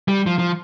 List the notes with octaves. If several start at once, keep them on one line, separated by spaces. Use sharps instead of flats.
G3
F3
F3